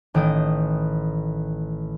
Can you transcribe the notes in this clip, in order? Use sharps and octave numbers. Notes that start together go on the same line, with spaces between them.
A1 D#3 G5 D#6